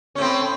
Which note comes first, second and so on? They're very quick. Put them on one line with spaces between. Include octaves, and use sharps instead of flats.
C#4 A2 C4